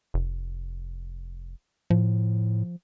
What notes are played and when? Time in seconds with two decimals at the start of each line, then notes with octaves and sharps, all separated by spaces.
0.14 F1
1.90 A2 F3